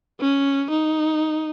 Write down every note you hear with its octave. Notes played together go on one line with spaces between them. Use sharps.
C#4
D#4